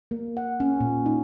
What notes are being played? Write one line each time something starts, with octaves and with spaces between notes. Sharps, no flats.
A#3
F#5
C#4
A#2
D#4